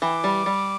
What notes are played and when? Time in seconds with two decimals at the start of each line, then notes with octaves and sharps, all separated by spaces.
0.02 E3 D6
0.24 G3
0.46 G3